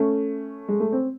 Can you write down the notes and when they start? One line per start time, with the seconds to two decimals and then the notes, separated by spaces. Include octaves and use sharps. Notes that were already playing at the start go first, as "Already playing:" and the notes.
Already playing: A3 C#4
0.69 G#3
0.80 A3
0.92 C4